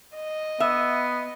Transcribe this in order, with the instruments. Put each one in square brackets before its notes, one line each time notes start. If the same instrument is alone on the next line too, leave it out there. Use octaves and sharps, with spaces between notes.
[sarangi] D#5
[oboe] B3 [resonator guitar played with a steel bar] E5